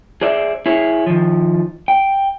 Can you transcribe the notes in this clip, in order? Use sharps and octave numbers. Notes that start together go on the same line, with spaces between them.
G#4 C5 D5 E5
E4 G#4 C#5
D#3 F3
G5